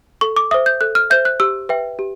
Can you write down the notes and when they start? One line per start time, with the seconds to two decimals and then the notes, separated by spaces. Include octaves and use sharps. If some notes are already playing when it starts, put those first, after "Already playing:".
0.21 A4 C#6
0.36 D6
0.51 C5 E5 D#6
0.66 G6
0.81 A4 F#6
0.95 F6
1.10 C5 E5 G6
1.25 F#6
1.40 G4 E6
1.69 B4 E5 G5
1.99 G4